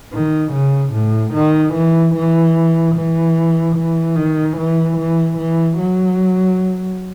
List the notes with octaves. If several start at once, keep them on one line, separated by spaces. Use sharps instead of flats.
D#3
C#3
A2
D#3
E3
E3
E3
E3
D#3
E3
E3
E3
F#3